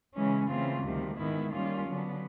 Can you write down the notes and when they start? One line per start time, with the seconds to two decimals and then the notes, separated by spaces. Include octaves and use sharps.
0.14 C#3 E3 G#3 C#4
0.48 C#3 E3 A3 C4 F4
0.82 D2 C3 D#3 G3
1.17 G#2 D#3 G#3 B3 E4
1.51 D#3 G3 A#3 C#4 F4
1.86 D3 F#3 B3